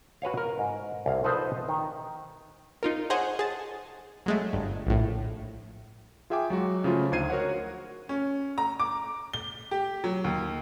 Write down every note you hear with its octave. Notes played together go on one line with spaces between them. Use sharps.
F#4 B4 C#5 F5
A#4
G#2
C2 F5
F3 D#4 A4 B4 C5
D#3
D#4 F4 A#4
G#4 C5 C#5 D#5 F#5 G#5
G#4 A5
F#3 G#3 A3
G1
A#1 A2
F4 G#4 E5 G5 G#5 D6
F#3 G#3 F#4
C#3 F3 A3 F4
D2 D#4 C5 G#6 C7 D#7
F#4 A#4 C#5 F#5
C#4
A#5
D6
G7
G4
F#3
D#2